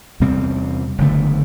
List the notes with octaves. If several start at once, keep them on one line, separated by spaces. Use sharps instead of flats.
E2 C3 G3 C4
F#1 E2 D3 A3